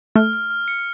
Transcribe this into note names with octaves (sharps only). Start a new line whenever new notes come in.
A3 F6
F6
F6
C#7